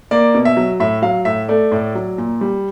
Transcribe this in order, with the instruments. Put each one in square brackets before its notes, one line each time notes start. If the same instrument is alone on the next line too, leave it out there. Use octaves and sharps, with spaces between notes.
[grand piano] A#3 D5
B2
E5
F#3
A2 E5
F#3 F5
A2 E5
A3 D5
A2
F#3
A#2
G3